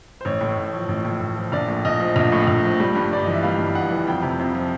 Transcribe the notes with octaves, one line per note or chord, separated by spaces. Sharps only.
C5
A1 C#5
A2
A1
F3
A1
A2
A1
F3
A#1 D5
A2
A#1 D#5
F3
A#1
A2
A#1
F3
G3
G2
G1 D5
E3 D#5
E5
G3 F5
G2
G1 F#5
E3
F2 G5
C3
F2
F3